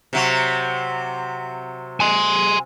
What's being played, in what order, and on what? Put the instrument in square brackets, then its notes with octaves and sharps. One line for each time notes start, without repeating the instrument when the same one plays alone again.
[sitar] C3 F#3
[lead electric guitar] G#5 C6